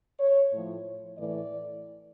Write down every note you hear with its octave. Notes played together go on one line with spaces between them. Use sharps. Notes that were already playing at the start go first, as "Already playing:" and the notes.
C#5
A2 F3
A2 E3 D5